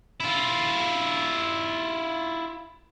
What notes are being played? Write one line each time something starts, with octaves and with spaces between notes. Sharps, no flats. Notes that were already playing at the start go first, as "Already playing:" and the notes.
E4 F4